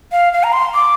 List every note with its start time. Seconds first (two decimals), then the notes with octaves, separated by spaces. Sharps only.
0.12 F5
0.33 F5
0.44 A#5
0.53 C6
0.74 D6